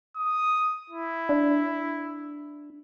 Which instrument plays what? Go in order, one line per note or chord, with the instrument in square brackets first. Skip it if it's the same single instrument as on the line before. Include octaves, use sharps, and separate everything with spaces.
[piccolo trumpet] D#6
E4
[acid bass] D4